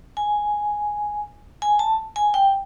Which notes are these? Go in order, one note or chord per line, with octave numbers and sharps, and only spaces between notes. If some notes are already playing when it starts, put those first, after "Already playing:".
G#5
G#5
A5
G#5
G5